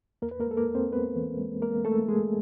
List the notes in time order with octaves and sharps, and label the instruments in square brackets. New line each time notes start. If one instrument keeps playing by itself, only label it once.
[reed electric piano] E2 A#3 A#4
B4
A#3 A#4
G#3 A4
A#3 A#4
E2
C4 C5
G#3 B3 B4
E3
G#3
G#3 A#3 A#4
G#3 A3 A4
G#3 G#4